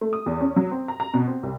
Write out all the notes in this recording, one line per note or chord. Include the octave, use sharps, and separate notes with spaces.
A3
D#6
E2
C#4
F#3
C4
A#5
A#5
B2
C4
C2